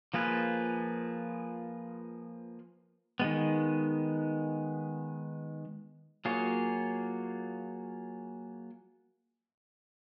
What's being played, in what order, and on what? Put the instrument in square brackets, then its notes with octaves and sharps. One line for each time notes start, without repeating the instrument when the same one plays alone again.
[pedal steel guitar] F3 A#3 F4 G#4 B4
D#3 G#3 B3
F#3 A#3 F4 G#4 C#5